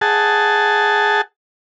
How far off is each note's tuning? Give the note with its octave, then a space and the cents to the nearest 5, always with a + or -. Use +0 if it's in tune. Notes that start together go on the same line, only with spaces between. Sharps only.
G#4 +0 F#5 +15 A5 +0